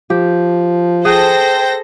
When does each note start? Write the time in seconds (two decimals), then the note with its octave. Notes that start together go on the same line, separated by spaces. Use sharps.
0.10 F3 G4
1.05 G#4 A4 C5 G5 A#6